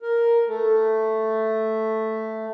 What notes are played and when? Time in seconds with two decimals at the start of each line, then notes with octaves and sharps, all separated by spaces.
0.02 A#4
0.47 A3